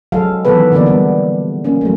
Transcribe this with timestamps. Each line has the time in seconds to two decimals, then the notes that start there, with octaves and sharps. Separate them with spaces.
0.12 F#3 G#3 A4 F5
0.45 D#3 E3 F#3 B3 A4 B4
0.72 D3 E3 A#3 B3 D5
0.86 G3 B3
1.64 A#3 C#4
1.81 F#3 A3